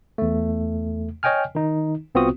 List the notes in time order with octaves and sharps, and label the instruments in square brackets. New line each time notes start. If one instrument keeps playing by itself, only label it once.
[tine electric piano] E2 A3
C#5 D#5 G5 G#5 F6
D#3 D#4
C2 B3 C4 F4 F#4 D#6